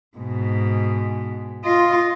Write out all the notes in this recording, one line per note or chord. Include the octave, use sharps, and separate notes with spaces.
G#2 B2
F4 D#5